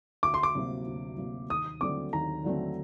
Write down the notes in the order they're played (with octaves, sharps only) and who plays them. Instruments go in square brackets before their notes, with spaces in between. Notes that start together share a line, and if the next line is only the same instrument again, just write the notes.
[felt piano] D2 [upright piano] D6
[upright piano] C6
D6
[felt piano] C3 F#3 A#3
D2
C3 F#3 A#3
[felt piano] D#2 [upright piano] D#6
[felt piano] D3 F#3 A3 C4 [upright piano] D6
[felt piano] D#2 [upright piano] A#5
[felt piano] D3 F#3 A3 C4